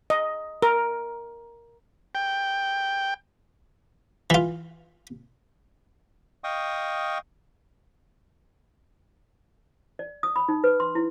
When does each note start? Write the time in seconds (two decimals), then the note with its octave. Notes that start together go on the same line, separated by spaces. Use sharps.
0.10 D#5
0.62 A#4
2.15 G5
4.30 E3 F4
6.44 D#5 F5 G5 C#6 D#6
9.99 D5
10.23 D#6
10.36 B5
10.49 D#4
10.64 B4
10.80 C6
10.95 E4